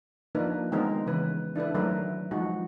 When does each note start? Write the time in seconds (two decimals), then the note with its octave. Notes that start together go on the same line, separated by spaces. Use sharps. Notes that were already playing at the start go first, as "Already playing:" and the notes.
0.35 F3 A#3 D4 D#4 A#4 B4
0.72 D#3 G#3 B3 C4 D#4 A#4
1.06 C#3 E3 B4
1.56 D4 E4 A4 B4
1.74 D#3 F#3 A3 E4 A#4 B4
2.31 F3 G#3 D#4 F#4